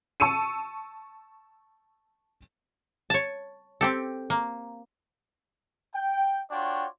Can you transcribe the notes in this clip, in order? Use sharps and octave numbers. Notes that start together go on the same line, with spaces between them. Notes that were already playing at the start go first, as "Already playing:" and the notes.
A5 C#6 E6 C#7 D#7
C#5 A5
C4 G4 A4
A#3
G5
D4 F4 F#4 C#5 D5 G5